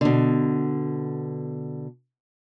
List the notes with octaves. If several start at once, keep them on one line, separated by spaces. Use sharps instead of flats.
B2 D3